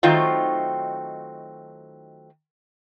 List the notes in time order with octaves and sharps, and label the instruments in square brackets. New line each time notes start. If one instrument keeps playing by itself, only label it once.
[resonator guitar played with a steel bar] D#3 F#3 A3 C4 D#4 F4